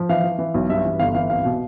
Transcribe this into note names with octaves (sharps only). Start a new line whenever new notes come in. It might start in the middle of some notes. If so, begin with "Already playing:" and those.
Already playing: F3
E3 F5
E3
E3
B1
G2 E5
E3
G1 F5
E3 F5
C2 F5
B2